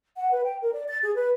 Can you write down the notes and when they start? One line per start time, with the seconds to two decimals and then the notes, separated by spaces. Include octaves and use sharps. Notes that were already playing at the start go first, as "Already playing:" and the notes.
0.17 F#5
0.31 B4
0.44 G5
0.62 A#4
0.73 D5
0.88 A6
1.03 G#4
1.15 B4